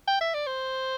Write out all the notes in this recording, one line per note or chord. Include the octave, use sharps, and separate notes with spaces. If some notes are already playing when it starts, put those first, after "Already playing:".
G5
E5
D5
C5